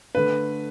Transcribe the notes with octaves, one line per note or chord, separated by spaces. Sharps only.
D3 A3 B4